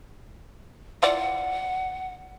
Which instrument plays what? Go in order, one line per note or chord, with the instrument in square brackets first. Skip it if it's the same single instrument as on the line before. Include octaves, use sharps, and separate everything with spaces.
[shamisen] E4 F4 D5 [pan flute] F#5